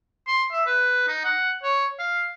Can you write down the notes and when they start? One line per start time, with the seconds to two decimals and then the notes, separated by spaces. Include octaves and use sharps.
0.28 C6
0.52 E5
0.67 B4
1.08 D#4
1.24 F#5
1.63 C#5
1.99 F5